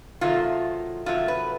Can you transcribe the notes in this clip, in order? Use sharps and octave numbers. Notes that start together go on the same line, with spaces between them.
C3 D#3 F#3 A3 F4
C3 D#3 F#3 A3 F4
B4